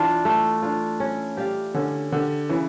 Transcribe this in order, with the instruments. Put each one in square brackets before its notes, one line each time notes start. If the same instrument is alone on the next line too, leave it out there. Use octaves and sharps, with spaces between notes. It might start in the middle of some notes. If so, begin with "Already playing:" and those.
Already playing: [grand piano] E3 [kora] D4 F4
[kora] A3
D4 F4
C#4
G4 D5 F5
[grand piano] D3 [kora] C#4
[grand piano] D3 [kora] G4 D5 F5
[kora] C#3 [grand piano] E3